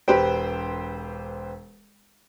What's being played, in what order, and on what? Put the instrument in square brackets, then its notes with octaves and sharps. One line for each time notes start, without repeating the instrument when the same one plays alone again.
[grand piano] E1 G4 B4 C5 G5